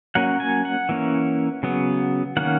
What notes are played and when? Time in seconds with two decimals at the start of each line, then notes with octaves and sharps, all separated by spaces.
0.15 F#3 A#3 C#4 F#5
0.40 G#5
0.65 F#5
0.89 E3 A#3 C#4
1.63 C#3 F#3 B3
2.37 D#3 A#3 C#4 F#5